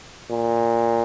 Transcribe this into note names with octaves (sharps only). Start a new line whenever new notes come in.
A#2